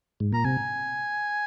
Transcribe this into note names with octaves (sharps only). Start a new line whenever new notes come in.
G#2
A#2 A#5
C3 G#5